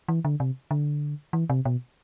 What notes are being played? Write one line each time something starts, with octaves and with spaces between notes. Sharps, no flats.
E3
D3
C3
D3
E3
C3
B2